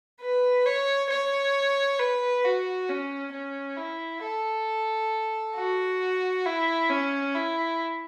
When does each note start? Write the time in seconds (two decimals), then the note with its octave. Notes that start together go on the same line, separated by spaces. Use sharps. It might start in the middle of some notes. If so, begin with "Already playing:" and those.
0.21 B4
0.66 C#5
1.10 C#5
1.99 B4
2.44 F#4
2.89 C#4
3.33 C#4
3.77 E4
4.23 A4
5.56 F#4
6.46 E4
6.90 C#4
7.35 E4